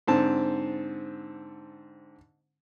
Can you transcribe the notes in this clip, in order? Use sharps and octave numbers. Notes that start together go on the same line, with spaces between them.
G#2 D3 C4 A5